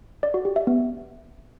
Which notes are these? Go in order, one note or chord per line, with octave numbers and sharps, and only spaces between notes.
D5
F#4
G4
E5
B3